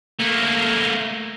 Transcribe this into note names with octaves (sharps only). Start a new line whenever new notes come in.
A3 A#3